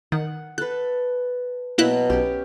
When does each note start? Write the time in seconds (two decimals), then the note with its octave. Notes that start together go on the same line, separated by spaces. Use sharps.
0.12 D#3 F#5
0.58 A4 B4 F#6
1.78 B2 F#3 A#3 E4 D#5 F#6
2.10 B1 C#4 G4